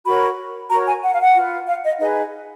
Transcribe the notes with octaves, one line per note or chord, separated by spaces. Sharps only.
F#4 A#4 C#5 B5
F#4 A#4 C#5 A#5
G#5
F#5
F5
F#5
F4 B4
F5
D#5
D#4 G#4 B4 D#5